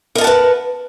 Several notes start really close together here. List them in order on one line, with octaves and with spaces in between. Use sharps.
A#4 D#5 A5 F#5 B4